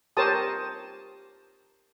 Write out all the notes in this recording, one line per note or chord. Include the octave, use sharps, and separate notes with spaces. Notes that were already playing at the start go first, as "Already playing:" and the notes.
G4 A#4 C5 C#5 A5 D#6